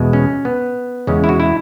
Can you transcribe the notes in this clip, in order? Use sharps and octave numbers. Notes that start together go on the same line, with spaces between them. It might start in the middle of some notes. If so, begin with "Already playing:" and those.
Already playing: E2 B2 G#3
C#4
B3
E2 C#3 G#3 C#4
E4
F#4
E4